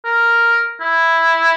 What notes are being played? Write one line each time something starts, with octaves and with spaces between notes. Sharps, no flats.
A#4
E4